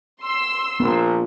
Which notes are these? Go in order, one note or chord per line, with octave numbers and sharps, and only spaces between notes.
C6 E6
A#1 B3